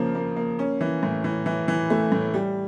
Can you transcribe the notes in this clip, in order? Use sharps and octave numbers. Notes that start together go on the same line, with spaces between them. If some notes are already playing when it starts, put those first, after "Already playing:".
Already playing: C#3 F3 A#3
A#3
A#3
C#4
E3
A2
E3
E3
E3
A3
A2
G3